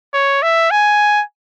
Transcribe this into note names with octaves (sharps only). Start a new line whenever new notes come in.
C#5
E5
G#5